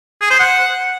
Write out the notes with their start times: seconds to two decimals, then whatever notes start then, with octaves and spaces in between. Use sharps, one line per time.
0.21 G#4
0.30 C5
0.40 F#5